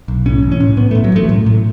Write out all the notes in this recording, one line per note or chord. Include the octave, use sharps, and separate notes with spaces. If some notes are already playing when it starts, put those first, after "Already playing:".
B1
A2 C#4
A1
C#4
A2
A2 B3
A2 A3
F#3
A1 A3
A2
A2